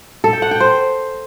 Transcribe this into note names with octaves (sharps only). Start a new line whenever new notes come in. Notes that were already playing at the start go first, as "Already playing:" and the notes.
A4
G5
F#5
G5
C5